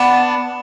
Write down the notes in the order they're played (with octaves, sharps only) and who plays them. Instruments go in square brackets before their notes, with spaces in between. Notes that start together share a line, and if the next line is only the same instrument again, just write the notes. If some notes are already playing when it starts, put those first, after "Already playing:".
Already playing: [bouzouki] B3 D4